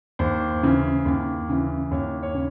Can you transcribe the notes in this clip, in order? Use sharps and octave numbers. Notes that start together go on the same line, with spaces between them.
D#2 C5
C#3 E3
D#2
C#3 E3
D#2 C#5
C#5
C#3